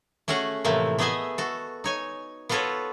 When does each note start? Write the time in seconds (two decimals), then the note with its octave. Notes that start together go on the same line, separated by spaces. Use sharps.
0.28 A3 C#4 F#4 G#4 F#5
0.64 A2 C3 E3 F3 A3 A#3
0.99 A3 B3 G#4 D#5 E5 G#5
1.38 F#4 A4
1.84 D#4 C#5 G#5
2.49 B3 F4 F#4 A4 B4 C#5